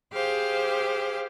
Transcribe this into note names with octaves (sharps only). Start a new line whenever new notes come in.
G4 G#4 C5 F5